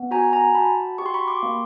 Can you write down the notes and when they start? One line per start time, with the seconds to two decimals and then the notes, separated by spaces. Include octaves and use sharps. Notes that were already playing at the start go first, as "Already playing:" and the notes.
Already playing: B3
0.11 F#4 G#5 A#5
0.33 G#5 A#5
0.54 F#4 A5 B5
0.98 G4 C#6
1.06 C6
1.14 B5 C#6
1.28 C6 D6
1.43 A#3